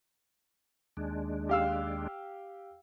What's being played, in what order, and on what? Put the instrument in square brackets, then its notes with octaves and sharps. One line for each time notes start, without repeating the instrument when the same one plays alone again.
[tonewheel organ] D#2 G#3 D4
[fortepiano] G4 F5 E6